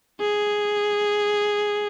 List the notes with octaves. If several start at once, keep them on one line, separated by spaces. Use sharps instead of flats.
G#4